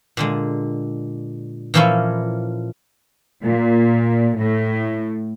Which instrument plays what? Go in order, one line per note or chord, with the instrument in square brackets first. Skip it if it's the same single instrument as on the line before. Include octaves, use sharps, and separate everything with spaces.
[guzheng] A#2 D3 G#3
A#2 E3 F3 A#3 C#4 E4
[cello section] A#2
A2